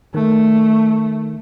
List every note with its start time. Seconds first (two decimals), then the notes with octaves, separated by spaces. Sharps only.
0.15 D#3 A3